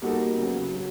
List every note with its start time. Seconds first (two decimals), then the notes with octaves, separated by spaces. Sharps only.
0.02 G3 A#3 D#4 F#4 A4
0.38 C#3 F#3 B3
0.75 F#3